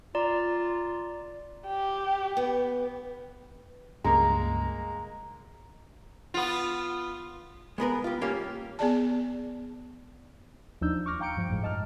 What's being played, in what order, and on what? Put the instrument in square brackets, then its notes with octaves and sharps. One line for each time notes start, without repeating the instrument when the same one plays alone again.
[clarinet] F4 [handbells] D5 A#5
[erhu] G4
[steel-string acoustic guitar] B3
[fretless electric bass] C#2 G2 [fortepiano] G#3 A#3 [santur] A#5
[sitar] B3 F4
[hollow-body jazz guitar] G#3 B3 A#4 B4
F4 G4
G3 A#3 C#4 F4
[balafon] B3 G#4 D5 A5
[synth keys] D#2 F3 D4 D#4 E6 G6
C#6 D6 F6 A#6
F5 G5 A#5 G6 C#7 D7
G2 F3
G#1 F2 A2 F3 G#3
G2 D#5 A5 A#5 F6